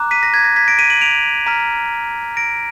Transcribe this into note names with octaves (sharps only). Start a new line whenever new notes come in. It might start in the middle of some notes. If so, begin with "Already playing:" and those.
Already playing: A#5 D6 F#6
B6 D#7
A#6
G#6
A#6
G#6 B6
A#6 D7
B6 D#7
D#7 F#7
D7 F7
A#5 F6 B6 D#7
A#6 D7